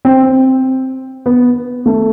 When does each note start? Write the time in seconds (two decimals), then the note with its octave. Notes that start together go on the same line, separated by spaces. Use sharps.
0.05 C4
1.26 B3
1.86 A3